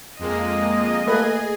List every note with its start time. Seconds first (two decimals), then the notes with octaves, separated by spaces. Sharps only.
0.19 F2 G#3 A#3 D#5
1.07 A3 A#3 G#4 B4 G#5